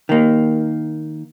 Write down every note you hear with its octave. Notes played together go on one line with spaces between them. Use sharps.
D#3 A#3